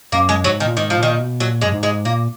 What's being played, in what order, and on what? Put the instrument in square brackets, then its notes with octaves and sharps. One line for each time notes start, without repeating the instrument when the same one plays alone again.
[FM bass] F#2 [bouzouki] A#3
[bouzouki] G#3
[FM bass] G#2 [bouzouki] F#3
[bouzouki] D#3
[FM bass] A#2
[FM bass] G#2 [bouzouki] D#3
[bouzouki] F3
[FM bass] A#2 [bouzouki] D#3
[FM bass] B2
[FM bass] A#2 [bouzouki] F#3
[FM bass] F#2 [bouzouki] G#3
[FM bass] G#2
[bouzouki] G#3
[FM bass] A#2 [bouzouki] A#3